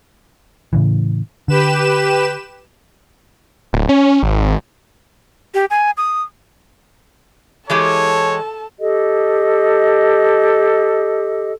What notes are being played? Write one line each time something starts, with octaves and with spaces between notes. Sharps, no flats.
A2 C#3 E3
D3 G4 B4 E7
D1
C#4
G#1
G4
G#5
D#6
E3 G#3 G4 A4 C#5 A5
G4 A4 D#5